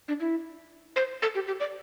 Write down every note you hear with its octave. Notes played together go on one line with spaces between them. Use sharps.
D4
E4
C5
A4
G4
G4
D5